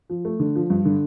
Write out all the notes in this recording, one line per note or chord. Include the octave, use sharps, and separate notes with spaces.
F3
A3
D3
F3
G2
D3